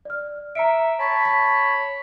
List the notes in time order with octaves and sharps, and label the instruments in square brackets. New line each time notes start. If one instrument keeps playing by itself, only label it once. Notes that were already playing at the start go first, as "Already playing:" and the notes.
[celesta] D5 F6
[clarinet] E5 [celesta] A#5 C#7 D7
[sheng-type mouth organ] C#5 A5 [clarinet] B5
[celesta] B6